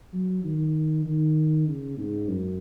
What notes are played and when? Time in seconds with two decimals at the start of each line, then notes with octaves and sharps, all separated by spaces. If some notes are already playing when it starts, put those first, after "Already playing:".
0.13 F#3
0.44 D#3
1.05 D#3
1.67 C#3
1.97 G#2
2.28 F#2